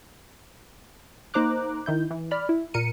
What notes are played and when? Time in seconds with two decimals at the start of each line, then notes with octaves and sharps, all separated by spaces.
1.34 A#3 D#4 C5 A#5 D6 F#6
1.86 D#3 E4 G6
2.11 E3
2.31 D5 B5 F6
2.49 E4
2.74 A#2 A#4 C#7 D#7